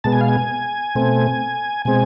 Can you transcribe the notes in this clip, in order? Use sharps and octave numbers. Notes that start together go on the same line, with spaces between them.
B2 G#3 B3 A5
G#5
F5
G#5
B2 A3 C4
B2 G#3 C4 G#5